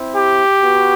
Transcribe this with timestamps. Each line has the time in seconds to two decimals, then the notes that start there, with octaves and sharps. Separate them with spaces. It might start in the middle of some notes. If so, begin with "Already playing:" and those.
Already playing: C4 E4
0.15 G4
0.59 B3 F#4